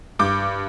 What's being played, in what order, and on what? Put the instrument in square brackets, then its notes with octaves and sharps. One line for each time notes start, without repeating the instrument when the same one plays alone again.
[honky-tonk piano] G2 D6 G6